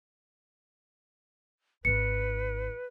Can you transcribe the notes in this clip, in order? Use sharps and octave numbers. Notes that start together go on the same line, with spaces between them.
G#1 E4 B4 C#7